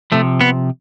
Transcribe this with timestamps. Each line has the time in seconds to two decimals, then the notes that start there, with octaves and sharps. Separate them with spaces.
0.12 C3 F3 A3
0.41 B3